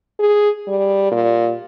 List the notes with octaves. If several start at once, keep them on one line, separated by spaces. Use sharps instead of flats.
G#4
G3
A#2